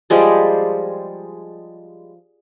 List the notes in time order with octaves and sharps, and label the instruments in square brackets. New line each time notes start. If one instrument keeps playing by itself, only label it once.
[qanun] F3 G3 G#3 D5